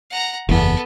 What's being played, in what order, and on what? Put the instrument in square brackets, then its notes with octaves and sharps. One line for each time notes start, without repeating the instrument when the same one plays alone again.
[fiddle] F#5 A#5
[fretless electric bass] F#1 E2 [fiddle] B3 A4